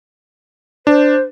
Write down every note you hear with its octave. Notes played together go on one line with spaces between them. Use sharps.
D4 C5